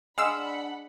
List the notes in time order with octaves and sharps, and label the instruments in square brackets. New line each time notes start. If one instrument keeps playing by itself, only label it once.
[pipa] G#3 [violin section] D4 F#5 B5 [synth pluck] F5 E6